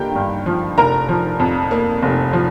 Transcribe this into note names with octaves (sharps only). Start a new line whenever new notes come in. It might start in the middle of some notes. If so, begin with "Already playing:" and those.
Already playing: G2 D3 A#3 G4 G5 A#5
G2
F3
F1 A#4 A#5
F3
F2
A#3
F1
F3